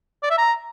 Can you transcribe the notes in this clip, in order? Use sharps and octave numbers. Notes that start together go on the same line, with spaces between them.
D5
E5
A#5